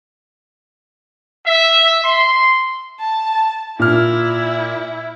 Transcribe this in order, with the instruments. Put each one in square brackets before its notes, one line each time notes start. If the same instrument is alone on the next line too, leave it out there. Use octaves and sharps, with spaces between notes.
[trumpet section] E5
C6
[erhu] A5
[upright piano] A#2 F6 [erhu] E4